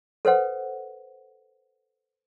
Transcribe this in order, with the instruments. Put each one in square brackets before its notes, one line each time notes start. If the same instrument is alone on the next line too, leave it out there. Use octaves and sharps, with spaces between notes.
[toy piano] A4 B4 C5 F#5